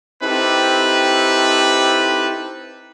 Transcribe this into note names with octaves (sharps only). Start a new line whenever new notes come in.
C4 D#4 E4 G4 A4 B4